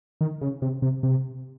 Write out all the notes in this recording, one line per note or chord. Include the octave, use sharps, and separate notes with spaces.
D#3
C#3
C3
C3
C3